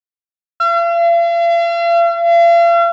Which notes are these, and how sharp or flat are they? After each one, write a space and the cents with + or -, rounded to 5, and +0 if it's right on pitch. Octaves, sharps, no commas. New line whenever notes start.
F5 -45